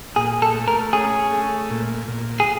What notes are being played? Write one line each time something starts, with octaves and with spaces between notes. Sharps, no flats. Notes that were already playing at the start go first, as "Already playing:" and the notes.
A#2 G#4
A4
A3
A#4
C#4 G#4
A3
A#2
A#2
G#4